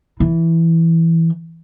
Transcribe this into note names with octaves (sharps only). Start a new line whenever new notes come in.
E3